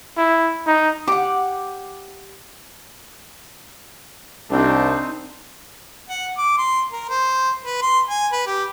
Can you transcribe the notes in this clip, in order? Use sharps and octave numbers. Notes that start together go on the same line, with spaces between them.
E4
D#4
G4 F#5 D6
C2 C4 D4 D#4
F#5
D6
C6
A#4
C5
B4
C6
G#5
B4
G4